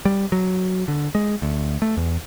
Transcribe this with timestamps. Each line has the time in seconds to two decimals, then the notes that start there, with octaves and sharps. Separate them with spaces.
0.05 G3
0.32 F#3
0.88 D3
1.15 G#3
1.42 D2
1.82 A3
1.97 E2